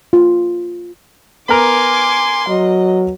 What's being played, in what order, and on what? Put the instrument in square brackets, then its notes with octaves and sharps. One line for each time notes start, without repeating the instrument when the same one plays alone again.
[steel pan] F4
[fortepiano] B3 A#4 [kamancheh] G#5 D6 [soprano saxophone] C6
[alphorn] F#3 [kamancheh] D#5